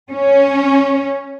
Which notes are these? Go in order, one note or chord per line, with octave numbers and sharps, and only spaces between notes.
C#4